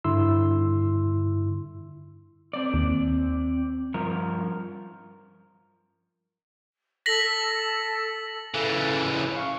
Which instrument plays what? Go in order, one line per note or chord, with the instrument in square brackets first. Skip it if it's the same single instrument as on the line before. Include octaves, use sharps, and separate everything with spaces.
[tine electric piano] G2 D3 E4 C6 E6
[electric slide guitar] C4 D5
[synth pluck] D#2
[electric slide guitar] G2 F3 A#4
[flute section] A4 [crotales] A#6 B6 F#7
[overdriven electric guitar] C#3 E3 [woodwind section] A4
[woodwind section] A2
F5 C#6